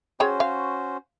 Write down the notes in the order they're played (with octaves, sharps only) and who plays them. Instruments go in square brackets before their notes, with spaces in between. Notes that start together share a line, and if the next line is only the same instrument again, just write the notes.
[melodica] C#4 F#4 C5 [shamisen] G#4 C#5 G5
[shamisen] F5